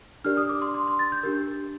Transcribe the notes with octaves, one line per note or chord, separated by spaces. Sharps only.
D4 G4 A#4 D5 F6
D#6
D6
C6
C6
C6
A6
G6
D4 G4 A#4